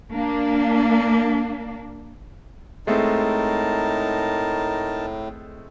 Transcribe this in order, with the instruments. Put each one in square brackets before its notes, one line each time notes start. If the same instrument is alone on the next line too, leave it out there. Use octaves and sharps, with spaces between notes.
[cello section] A#3 D4
[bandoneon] A2 [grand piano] G#3 A3 C4 [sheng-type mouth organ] D#4 A#4 A5